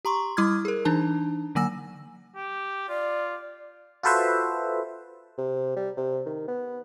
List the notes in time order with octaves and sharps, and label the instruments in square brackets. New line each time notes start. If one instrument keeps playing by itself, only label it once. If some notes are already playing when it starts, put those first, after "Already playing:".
[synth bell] G4 A#5 C6 C#6
G3 E4 D6 D#6 F6 G#6
G#4 A#4
E3 D4 D#4 A5
D3 F#3 A#3 G#5 E6 A#6
[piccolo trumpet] G4
[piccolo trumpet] F4 [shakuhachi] D5
[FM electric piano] F4 F#4 A4 B4 C5 E5
[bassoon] C3
G3
C3
D#3
B3